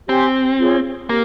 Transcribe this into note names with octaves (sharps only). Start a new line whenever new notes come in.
C4 G4 C#5 G#5 C6
F4 G#4 C#5
A#3 G4 A#4